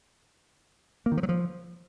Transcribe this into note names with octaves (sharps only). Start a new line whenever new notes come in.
A#3
D#3
F3
F#3
F3